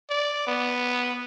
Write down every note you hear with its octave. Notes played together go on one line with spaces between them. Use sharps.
D5
B3